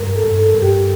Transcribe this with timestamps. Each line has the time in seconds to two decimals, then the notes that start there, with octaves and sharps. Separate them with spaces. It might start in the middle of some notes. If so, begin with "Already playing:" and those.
Already playing: G2 A#4
0.16 A4
0.24 G2
0.39 A4
0.55 G2
0.62 G4